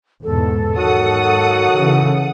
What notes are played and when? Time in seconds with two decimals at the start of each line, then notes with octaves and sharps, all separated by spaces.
0.23 E2 G#2 B2 A4
0.77 G#2 D#3 F#3 F#4 F#5 D#6
1.74 C#3 E3